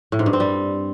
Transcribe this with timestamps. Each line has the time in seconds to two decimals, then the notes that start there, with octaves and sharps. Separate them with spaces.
0.12 A2
0.19 G#2
0.26 G2
0.33 C4
0.40 G3